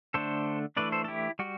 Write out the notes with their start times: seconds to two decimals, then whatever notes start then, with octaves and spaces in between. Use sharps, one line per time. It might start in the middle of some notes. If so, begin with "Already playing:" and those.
0.14 D3 A3 D4 A4 C5
0.77 E3 A3 D4 B4 D5
0.92 A4 C5
1.04 A4
1.08 E4 G4
1.39 G3 F#4